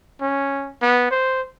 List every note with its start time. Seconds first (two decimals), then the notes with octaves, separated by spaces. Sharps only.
0.21 C#4
0.81 B3
1.10 C5